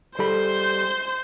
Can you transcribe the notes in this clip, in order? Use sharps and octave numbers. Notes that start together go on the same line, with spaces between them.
G3 A4 C5 B5 C6